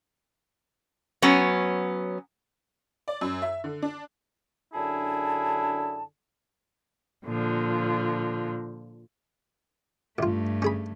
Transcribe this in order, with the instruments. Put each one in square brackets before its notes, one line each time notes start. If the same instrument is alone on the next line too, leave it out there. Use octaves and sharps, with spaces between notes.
[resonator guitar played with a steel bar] F#3 B3 C#4
[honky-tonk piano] D5
F#2
E5
D3
D4
[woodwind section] F#2 D3 D4 E4 G#4 A5
[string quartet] A#2 D3 F3
[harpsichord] A1 F4 [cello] G2 A3
[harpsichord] C#4 G#4 B5